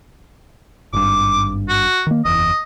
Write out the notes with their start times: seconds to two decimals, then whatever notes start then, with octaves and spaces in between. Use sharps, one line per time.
0.93 G#1 G2 D6
1.69 F#4
2.07 D#3 A#3
2.25 F#1 E2 D#5